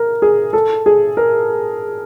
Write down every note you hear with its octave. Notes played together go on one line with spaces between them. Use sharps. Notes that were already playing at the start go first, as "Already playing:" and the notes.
Already playing: A#4
G#4
A4
G#4
A#4